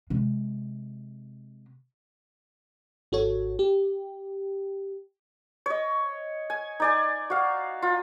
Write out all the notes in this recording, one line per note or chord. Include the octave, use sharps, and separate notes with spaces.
C3 G#3
G#1 F#4 A4 C#5
G4
C#5 D#5
G#5
D#4 D5 G#5
F#4 F5
F4